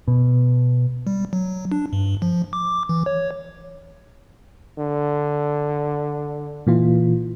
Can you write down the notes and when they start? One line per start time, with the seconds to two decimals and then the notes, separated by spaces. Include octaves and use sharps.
0.08 B2
1.07 G3
1.33 F#3
1.72 D4
1.93 G2
2.22 F3
2.53 D6
2.89 E3
3.06 C#5
4.78 D3
6.67 A#2 E3 F4